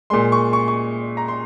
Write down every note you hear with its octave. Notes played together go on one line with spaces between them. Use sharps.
A#2 G#3 C6
C#6
C#6
C#6
A#5
C6